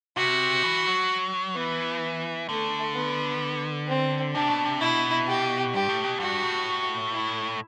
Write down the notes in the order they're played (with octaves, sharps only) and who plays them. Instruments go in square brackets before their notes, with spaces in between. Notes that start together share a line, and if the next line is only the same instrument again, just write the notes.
[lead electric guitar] C3 [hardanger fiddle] F#4
[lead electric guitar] E3
F#3
[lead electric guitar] E3 [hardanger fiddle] B3
[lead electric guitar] D3 [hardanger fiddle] A3
[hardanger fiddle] B3
C4
[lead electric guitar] C3 [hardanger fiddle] D4
[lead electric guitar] B2
C3
[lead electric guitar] B2 [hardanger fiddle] E4
[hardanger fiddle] G4
[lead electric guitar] G2 [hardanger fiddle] G4
[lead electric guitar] A2
B2
[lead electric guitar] G2 [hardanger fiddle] F#4
[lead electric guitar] A2
[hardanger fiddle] E4